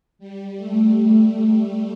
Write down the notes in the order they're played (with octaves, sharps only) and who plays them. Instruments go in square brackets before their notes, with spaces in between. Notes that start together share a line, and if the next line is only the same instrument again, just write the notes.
[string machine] G3
A3